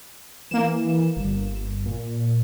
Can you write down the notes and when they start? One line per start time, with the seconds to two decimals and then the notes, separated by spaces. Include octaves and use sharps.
0.51 E3 A#3 E7
1.17 G1
1.86 A#2